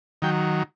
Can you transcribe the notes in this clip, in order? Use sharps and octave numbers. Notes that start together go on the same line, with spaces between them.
D#3 F#3 G5